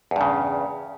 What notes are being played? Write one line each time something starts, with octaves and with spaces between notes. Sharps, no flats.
E2 G2 C#3